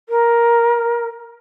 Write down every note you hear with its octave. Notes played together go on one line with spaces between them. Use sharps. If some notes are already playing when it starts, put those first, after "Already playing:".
A#4